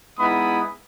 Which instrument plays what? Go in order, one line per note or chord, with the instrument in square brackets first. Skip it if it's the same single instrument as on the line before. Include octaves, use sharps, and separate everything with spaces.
[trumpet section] G#3 B3 D#4 E4 B5 D#6